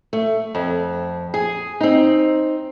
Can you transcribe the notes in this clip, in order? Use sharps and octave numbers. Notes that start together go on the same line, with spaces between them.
A3
F2
G#4
C4 D#4